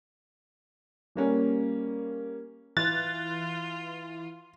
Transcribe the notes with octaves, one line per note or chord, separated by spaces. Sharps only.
G3 A#3 C#4 G4
E3 F4 F#6 A6